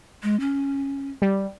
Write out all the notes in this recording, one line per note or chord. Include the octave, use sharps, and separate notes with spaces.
G#3
C#4
G3